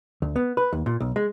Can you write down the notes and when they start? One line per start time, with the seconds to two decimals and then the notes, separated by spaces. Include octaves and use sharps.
0.22 D2
0.36 B3
0.57 B4
0.73 D#2
0.86 A#2
1.00 B1
1.16 G#3